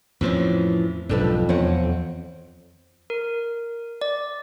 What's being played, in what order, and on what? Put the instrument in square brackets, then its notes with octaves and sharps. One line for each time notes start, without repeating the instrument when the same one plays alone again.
[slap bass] F2 A2 F3 [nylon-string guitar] E3 C4 C#4
[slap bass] B1 G#2 [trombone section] F2 [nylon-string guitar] D4 A4 B4
[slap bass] E2 [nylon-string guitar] C4 C#5 F#5
[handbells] A#4
D5